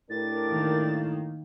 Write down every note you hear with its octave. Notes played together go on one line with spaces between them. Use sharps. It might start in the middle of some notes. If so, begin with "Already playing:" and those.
A2 D4 G4 A#4 A6
D#3 A#3